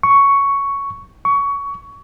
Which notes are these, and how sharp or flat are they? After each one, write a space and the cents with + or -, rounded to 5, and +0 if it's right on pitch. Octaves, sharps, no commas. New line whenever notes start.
C#6 +5
C#6 +20